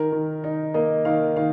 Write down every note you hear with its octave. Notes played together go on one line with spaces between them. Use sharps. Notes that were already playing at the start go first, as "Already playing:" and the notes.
Already playing: D#3 A#4
D#3
D#4
A#3 D#5
D#3 F5
D#3 F5